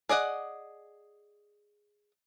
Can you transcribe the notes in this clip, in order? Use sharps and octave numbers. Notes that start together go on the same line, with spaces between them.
G#4 D5 D#5 F#5